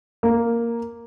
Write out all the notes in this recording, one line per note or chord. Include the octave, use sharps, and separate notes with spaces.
A#3